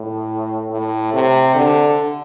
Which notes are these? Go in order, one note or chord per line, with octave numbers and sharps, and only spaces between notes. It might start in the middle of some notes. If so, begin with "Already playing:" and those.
Already playing: A2
A2
C3
D3